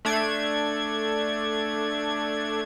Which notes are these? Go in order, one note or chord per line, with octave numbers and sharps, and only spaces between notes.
A3 D4 G#6